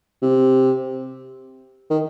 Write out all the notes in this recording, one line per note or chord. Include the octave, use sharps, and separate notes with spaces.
C3
D#3